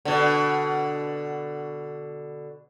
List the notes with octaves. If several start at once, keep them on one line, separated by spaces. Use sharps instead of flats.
B2 D3